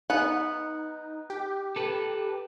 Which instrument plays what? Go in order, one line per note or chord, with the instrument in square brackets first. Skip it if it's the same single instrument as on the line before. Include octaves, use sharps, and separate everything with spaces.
[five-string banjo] B3 F#5 [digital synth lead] D#4
[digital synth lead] G4
[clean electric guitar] A4 B4